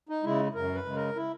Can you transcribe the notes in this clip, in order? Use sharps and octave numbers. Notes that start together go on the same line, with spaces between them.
D#4
C#3 G#3 E4
F#2 A#4
B4
C#3 G#3
A#4
E4